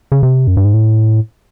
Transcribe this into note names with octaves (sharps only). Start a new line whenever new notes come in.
C#3
C3
F#2
G2
G#2
A2